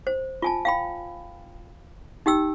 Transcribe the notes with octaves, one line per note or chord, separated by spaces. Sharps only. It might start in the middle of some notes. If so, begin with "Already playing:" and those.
C5
F4 G#5 A5
F5 G5 B5
D#4 G4 G5 E6